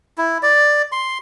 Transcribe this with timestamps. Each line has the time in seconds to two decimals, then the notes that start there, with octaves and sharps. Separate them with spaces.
0.18 E4
0.43 D5
0.92 C6